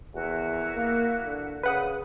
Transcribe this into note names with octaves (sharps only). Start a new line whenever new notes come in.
E2 E4 F#4 A#4
A#3
D3
C#3 B4 F#5 D#6